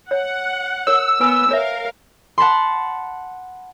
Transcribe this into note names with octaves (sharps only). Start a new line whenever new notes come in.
C#5 F#5
A#4 C#5 E6
B3 B4 G#5
A#4 C#5 E5 F5
F#5 A5 B5 C6